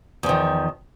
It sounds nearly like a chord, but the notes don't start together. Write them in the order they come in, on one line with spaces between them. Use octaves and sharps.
E2 F3 D#3